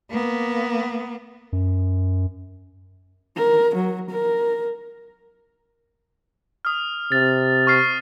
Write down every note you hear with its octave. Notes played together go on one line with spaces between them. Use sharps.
A#3 B3
F#2
A#4
F#3
A#4
D#6 F6
C3 A6
C#6 F6 C7